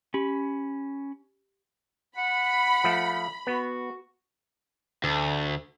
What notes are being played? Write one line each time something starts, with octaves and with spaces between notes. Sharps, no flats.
C#4 G4 B5
F#5 B5
F3 A3
B3 F#4
D2